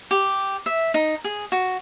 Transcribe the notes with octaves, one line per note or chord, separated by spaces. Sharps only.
G4
E5
D#4
G#4
F#4